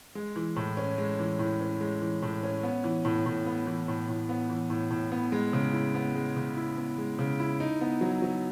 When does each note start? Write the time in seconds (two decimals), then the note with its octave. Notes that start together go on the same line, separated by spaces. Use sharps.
0.15 G#3
0.36 E3
0.56 A2
0.77 C#4
0.98 G#3
1.19 E3
1.39 A2
1.60 C#4
1.81 G#3
2.01 E3
2.22 A2
2.43 C#4
2.63 B3
2.84 E3
3.05 A2
3.26 A2
3.46 B3
3.67 E3
3.88 A2
4.09 A2
4.29 B3
4.50 E3
4.70 A2
4.90 A2
5.11 B3
5.32 G#3
5.53 C#3
5.73 E4
5.94 B3
6.15 G#3
6.36 C#3
6.57 E4
6.77 B3
6.98 G#3
7.19 C#3
7.40 E4
7.60 D#4
7.81 B3
8.01 F#3
8.22 F#3